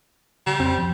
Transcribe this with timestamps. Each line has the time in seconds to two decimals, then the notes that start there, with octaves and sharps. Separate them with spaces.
0.47 C#3 G3
0.60 F2 C4
0.78 F3